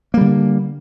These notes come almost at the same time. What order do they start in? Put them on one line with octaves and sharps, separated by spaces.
A#3 G3 D3